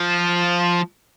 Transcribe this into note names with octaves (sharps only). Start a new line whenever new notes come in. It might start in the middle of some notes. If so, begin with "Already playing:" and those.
Already playing: F3